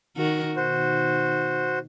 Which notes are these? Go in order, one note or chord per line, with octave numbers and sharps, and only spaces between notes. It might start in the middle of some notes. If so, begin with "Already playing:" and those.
D#3 F#4 A#4
B2 D#3 F#4 C5